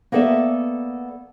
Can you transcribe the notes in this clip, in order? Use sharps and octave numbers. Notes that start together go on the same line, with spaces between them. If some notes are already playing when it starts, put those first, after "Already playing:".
A#3 B3 A4 D5 E5